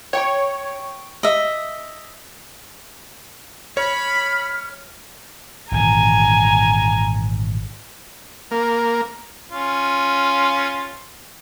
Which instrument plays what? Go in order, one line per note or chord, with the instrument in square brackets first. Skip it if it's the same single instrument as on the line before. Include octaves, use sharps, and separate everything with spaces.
[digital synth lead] C#5 [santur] G5 C#6
[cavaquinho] D#5 E5
[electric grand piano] C#5 [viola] B5 [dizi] F6
[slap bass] G#1 A#2 E3 [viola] G#5 A#5
[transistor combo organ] A#3
[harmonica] C#4 F4